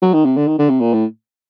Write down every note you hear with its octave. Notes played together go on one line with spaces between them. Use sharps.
F#3
D#3
C3
D3
D#3
D3
C3
A#2
A2